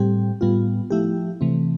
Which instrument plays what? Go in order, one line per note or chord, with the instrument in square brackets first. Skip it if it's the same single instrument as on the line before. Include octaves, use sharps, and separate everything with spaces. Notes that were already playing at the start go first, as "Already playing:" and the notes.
Already playing: [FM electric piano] A2 G3 C4 G4
A2 G3 B3 F4
F3 A3 E4 G4
C3 E3 A3 C4